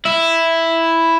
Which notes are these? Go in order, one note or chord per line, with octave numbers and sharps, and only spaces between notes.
E4